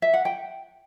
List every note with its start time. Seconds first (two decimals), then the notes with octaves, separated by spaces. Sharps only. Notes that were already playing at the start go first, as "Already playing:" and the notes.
0.02 E5
0.14 F#5
0.25 G5